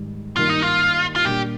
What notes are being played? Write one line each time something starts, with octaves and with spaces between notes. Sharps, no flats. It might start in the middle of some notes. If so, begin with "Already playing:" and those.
Already playing: G#2 D#3 G3
G2 D#3 A#3 F4
D#4
F4
F4
A#2 G3 A#3 D4 G4